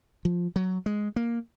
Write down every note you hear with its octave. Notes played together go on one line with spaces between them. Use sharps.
F3
F#3
G#3
A#3